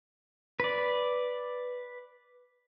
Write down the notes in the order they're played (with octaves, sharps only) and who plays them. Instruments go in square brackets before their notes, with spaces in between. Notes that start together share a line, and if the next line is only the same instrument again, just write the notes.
[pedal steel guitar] B4 D5